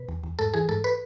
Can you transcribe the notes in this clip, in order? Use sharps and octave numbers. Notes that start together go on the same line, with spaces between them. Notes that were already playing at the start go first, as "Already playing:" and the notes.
Already playing: B2 B4
E2
E2
G#2 A4
E3 G#4
G#2 A4
B4